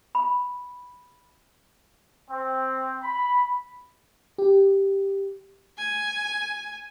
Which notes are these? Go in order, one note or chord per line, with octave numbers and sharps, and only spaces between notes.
B5
C4
B5
G4
G#5